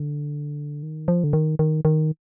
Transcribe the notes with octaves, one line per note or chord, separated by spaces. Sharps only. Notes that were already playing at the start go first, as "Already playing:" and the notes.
Already playing: D3
D#3
F3
D3
D#3
D#3
D#3